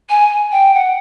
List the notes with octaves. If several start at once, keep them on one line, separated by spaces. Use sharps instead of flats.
G#5
G5
F#5